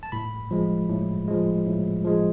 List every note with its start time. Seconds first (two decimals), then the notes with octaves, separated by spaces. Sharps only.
0.03 A5
0.12 A2 B5
0.51 F3 G#3
0.89 A2
1.28 F3 G#3
1.66 A2
2.04 F3 G#3